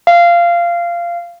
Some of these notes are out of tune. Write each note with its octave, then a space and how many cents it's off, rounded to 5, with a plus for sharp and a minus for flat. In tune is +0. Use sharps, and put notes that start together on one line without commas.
F5 -15